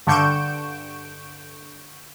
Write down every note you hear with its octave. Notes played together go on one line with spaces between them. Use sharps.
G2 D3 C#6 G6 D7 E7